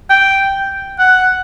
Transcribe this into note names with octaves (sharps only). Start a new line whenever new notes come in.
G5
F#5